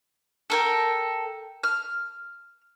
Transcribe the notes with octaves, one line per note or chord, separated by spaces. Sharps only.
A4 A#4 G5
F6